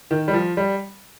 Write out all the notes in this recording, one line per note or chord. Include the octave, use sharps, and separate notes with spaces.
D#3
G3
F3
G3